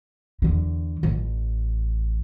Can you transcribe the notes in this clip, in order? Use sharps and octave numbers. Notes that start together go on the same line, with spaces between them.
E2 D3
A1